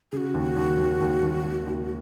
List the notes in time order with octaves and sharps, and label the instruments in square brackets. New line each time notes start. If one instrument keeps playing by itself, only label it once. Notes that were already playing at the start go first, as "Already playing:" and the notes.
[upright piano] C#3 [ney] F#4 G#4
[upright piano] D#2
D#2
D#2
D#2
D#2
D#2
D#2